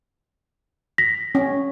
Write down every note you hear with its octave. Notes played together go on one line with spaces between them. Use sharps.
A#6 B6
C#4